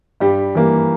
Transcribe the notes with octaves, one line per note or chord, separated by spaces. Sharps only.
G2 G3 G4
E3 G3 A#3